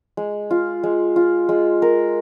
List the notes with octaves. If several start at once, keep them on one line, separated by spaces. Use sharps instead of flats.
G#3
F4
G#3
F4
G#3
A#4